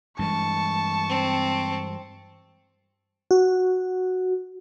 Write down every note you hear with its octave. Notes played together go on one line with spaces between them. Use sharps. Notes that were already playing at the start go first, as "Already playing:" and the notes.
G2 E3 G#3 A5 C#6
C4
F#4